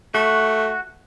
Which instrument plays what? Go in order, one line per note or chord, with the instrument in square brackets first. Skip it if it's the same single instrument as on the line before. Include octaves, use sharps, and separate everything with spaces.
[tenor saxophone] A3 [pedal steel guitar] F#4